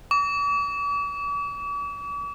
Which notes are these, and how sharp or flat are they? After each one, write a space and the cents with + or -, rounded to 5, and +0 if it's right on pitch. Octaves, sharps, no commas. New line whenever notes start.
D6 -45